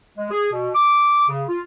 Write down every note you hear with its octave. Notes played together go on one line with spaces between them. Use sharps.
G#3
G#4
B2
D6
C#3
F4